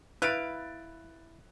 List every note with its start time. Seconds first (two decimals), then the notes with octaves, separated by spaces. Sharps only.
0.22 E4 B4 F5 F#6 A6 D7